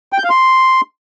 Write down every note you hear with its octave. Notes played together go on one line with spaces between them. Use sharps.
G5
G6
F5
C6